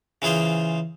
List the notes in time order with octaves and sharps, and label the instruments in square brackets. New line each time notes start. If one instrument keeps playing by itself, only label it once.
[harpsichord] C#3 E3 F4 G#4 C5